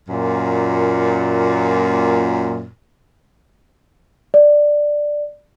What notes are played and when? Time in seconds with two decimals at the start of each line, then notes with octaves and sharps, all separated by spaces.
0.09 F#2 A#2
4.34 D5